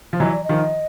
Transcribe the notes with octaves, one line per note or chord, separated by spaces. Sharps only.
F3
E3 F#3 D#5
D5
D#5
D#3 F3